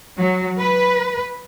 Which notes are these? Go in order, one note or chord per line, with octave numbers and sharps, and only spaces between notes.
F#3
B4